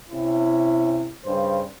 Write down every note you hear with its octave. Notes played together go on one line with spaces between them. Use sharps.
C3 C#4 E4
G2 C#3 C5